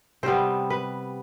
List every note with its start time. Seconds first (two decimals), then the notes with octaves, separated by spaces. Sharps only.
0.23 C3 G3 B3 C5
0.70 B4